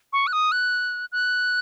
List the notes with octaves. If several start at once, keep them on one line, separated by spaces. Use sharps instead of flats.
C#6
F#6
D#6
F#6
F#6